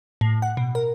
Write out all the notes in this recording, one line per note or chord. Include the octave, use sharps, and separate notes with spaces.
A2
F#5
B2
A#4